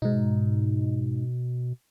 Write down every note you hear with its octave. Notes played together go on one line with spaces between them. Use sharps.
G#2 B2 D#4